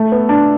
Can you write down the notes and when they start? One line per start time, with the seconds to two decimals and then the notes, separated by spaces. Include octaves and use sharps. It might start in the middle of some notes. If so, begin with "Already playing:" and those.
Already playing: A3
0.12 B3
0.29 D4